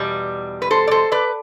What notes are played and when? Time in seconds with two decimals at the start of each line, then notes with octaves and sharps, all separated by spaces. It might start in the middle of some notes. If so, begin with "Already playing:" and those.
Already playing: E2 B2 G3
0.62 B4
0.71 A4 C5
0.88 D5
0.91 A4 C5
1.12 B4 D5